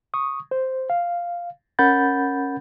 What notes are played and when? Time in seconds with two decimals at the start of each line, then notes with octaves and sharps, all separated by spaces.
0.14 C#6 D#6
0.51 C5
0.90 F5
1.79 C#4 A#4 F#5 B5 G6 A6